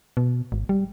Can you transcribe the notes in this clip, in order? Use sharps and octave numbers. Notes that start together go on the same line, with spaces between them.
B2
G#1
G3